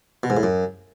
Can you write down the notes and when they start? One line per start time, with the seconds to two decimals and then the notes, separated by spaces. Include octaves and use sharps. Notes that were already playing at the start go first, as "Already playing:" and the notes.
0.23 B2
0.30 G#2
0.37 A2
0.43 F#2